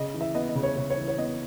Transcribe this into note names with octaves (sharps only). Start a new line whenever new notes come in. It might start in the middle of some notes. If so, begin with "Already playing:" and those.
Already playing: C#3 D#5
E3
E5
B3 D#5
D#5
C#3
C#5
C#3 C#5
C#5
E3
C#5
B3 D#5